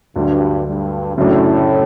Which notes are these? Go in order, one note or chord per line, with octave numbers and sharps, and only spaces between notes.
D2 G2 D3 F#3
G2
F#2 A2 C#3 F#3 A3 D4